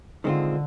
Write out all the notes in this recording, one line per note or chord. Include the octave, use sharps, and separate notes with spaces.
D3 D#3 G#3 C4 F4